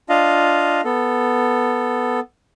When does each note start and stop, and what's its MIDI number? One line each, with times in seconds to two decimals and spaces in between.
0.09 0.81 62
0.09 0.81 65
0.09 0.81 75
0.09 0.81 77
0.85 2.20 59
0.85 2.20 69